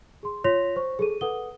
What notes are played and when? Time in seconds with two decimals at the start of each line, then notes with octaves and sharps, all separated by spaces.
0.23 G#4 C6
0.44 F4 C#5 C6 A#6 B6 F7
0.76 C5 C#6
0.99 G#4 A4 D#7
1.21 A4 B4 F#5 D#6 G7